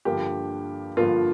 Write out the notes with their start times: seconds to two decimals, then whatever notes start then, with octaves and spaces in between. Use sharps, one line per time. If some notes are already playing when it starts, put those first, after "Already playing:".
0.05 G2 D3 F3 A#3 G4
0.97 G2 D3 F3 A#3 F4